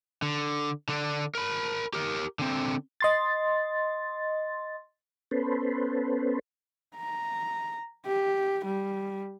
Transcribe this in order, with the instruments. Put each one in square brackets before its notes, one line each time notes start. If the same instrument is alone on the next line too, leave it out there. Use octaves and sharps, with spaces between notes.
[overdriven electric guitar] D3
D3 D4
A#4 B5
G4 A#4
D3 C4
[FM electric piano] D#5 C6 A6
[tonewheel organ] B3 C#4 A4 B4 C5
[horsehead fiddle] A#5
G4
G3